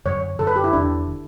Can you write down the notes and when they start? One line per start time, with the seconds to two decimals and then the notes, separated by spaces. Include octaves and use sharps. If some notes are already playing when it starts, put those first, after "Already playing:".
0.05 F#2 D3 F#3 C#5
0.39 F#2 D3 F#3 A4
0.47 B4
0.56 G4
0.64 E4
0.73 E1 E2 D3 D4
1.07 D3